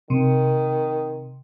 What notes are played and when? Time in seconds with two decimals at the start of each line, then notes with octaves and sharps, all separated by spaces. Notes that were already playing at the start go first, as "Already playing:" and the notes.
0.10 C3 D#3